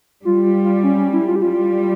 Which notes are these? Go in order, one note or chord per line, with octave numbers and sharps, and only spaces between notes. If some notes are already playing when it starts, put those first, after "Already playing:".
G3 F4
F4
F4
C#4
C#4
E4
F4
G4
G3 F4